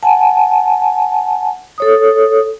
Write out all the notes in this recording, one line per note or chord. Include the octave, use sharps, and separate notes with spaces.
F#5 G#5 A5
A4 C#5 D#6